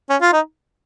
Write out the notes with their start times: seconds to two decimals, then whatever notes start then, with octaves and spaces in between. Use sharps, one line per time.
0.09 C#4
0.21 F4
0.33 D#4